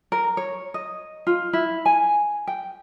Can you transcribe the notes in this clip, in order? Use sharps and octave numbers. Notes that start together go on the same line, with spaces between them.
A#4
C#5
D#5
F4
E4
G#5
G5